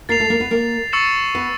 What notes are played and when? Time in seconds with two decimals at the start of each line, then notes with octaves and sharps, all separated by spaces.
0.09 A#3 A#4 A6 C7 F7
0.19 A3 A4
0.30 A#3 A#4
0.40 B3 B4
0.51 A#3 A#4
0.93 C#6 E6 A6 C#7 E7
1.35 B3 B4